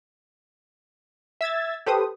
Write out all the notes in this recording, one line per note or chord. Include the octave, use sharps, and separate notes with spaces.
E5 E6 G#6 A6
G4 A4 B4 C5 D#6